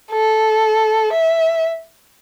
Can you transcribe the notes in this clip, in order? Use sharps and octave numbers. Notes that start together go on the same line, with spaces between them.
A4
E5